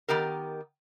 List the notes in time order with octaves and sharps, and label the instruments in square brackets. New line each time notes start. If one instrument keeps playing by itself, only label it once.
[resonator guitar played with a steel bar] D#3 B3 G4 A#4